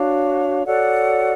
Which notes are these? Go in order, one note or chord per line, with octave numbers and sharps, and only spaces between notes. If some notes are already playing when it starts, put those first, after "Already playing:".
Already playing: D4 F#4 C#5 F5
F#4 A4 C#5 D5 F#5